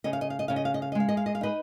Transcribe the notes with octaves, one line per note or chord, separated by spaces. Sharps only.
C#3 D#5
F5
D#5
F5
D#5
C#3 F5
D#5
F5
D#5
F5
D#5
G#3 F5
D#5
F5
D#5
F5
D#4 B4 D#5